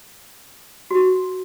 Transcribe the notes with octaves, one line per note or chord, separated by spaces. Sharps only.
F#4